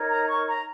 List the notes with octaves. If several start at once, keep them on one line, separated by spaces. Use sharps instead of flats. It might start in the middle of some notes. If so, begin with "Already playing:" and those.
Already playing: D#4 A#4 C#5
A#5
C#6
A#5